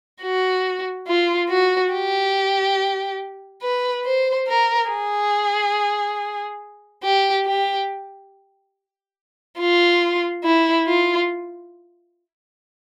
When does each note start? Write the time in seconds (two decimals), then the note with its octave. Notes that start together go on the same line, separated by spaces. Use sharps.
0.22 F#4
1.08 F4
1.50 F#4
1.93 G4
3.62 B4
4.05 C5
4.48 A#4
4.91 G#4
7.03 G4
7.47 G4
9.59 F4
10.44 E4
10.87 F4